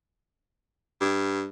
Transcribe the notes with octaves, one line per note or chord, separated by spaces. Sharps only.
G2